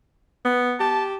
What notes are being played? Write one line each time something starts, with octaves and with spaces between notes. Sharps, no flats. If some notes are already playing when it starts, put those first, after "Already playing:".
B3
G4 A5